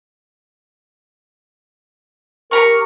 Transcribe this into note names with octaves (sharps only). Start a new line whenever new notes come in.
G4 A#4 A#5 C#6